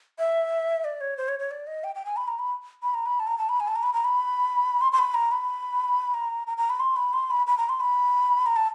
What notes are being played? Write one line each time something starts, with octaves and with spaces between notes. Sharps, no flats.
E5
D5
C#5
C5
C#5
C#5
D5
D#5
G5
G5
G#5
B5
A#5
B5
B5
A#5
B5
A5
A#5
A5
B5
G#5
A5
A#5
B5
A#5
B5
C6
C6
B5
A#5
B5
A#5
A#5
A#5
B5
C6
B5
C6
B5
B5
A#5
C6
B5
A#5
A5